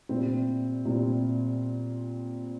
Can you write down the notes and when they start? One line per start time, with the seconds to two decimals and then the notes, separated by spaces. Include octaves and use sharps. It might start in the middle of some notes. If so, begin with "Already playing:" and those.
0.09 A#2 G3 C4 E4
0.85 A#2 G3 C4 E4